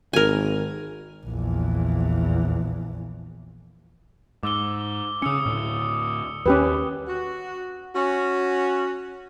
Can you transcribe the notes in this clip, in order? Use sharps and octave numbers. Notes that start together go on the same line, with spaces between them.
G#1 A#4 G#5
A#1 E2
G#2 D6 E6 G7
C#3 C#4 D#6 E6 C#7
D2 A2
D#2 D#3 C#4 G4 B4
F#4
C#4 F#4